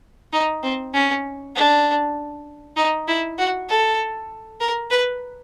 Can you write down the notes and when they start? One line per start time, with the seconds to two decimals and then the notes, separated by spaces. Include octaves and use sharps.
0.33 D#4
0.63 C4
0.94 C#4
1.55 D4
2.77 D#4
3.08 E4
3.38 F#4
3.69 A4
4.60 A#4
4.90 B4